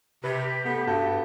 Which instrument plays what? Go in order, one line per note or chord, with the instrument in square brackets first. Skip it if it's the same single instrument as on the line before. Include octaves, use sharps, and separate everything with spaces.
[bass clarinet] C3 [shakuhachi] G4 [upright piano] B4
[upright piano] A3 [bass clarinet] B3
[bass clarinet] G2 [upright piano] F#4 A4